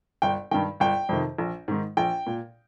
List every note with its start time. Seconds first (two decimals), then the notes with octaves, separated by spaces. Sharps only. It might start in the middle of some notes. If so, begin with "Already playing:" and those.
0.22 G1 G5
0.51 G2 D#3 G5
0.80 G1 G5
1.09 F2 C3 D#3
1.38 A#1
1.68 G#2 D#3
1.97 A#1 G5
2.27 A#2